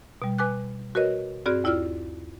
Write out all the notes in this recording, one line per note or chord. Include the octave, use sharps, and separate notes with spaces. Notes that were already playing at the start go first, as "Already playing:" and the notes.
B2 G3
B4 G#5 D6 F#6
F#4 A#4 B4 C#5 D#5
G2 C4 F#4 G#4 D5 F6
D#2 E4 F4 D5 E6 F6